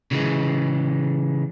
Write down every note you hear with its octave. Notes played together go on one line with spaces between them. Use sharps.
C#3 E3 G#3